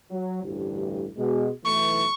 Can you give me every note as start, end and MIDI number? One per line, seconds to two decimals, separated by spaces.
0.11 0.42 54
0.44 1.06 33
0.44 1.06 38
0.44 1.06 43
1.18 1.50 47
1.18 1.50 56
1.64 2.05 35
1.64 2.05 52
1.64 2.05 57
1.64 2.14 85